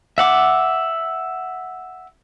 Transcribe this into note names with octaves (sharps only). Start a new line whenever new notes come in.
E5 F#5 D6